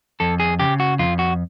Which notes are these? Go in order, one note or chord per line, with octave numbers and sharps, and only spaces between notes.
F2 A4
G#4
C#3 G4
F#4
F2 F4
F#4